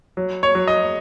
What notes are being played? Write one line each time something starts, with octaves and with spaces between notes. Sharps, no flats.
F#3
C#5
F#3
D#5